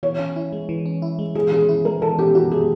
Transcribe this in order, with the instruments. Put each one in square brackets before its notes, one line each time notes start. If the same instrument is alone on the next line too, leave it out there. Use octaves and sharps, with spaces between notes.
[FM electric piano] E3 [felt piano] C#5
[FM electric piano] C#4
E4
G#3
E3
C#4
E4
G#3
[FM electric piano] E3 [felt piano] G#4
[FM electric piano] C#4 [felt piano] G#4
[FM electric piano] E4
[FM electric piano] G#3 [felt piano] A#4
[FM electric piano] E3 [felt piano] A4
[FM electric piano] C#4 [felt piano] G4
[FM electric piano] E4 [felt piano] F#4
[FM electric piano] G#3 [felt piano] G#4